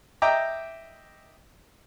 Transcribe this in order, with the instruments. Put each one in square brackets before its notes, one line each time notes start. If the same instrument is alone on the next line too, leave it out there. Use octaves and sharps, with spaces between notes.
[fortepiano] D#5 E5 G5 A#5 D6